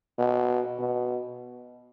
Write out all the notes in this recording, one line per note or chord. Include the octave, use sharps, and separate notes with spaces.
B2
B2